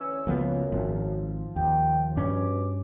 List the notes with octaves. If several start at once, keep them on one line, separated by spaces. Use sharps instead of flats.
D2 E3 C#4 E6
C#2 F#2 F3 A#3 B3
G#1 F3
D#2 G5
G2 B2 C#4 D6